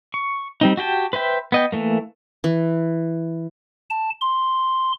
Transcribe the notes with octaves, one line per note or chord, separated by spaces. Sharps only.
C#6
G3 C4 D#4
F#4 G4 G5 A5
B4 C5 E5 G5
B3 D#5 G5
E3 A3 A#3
E3
A5
C6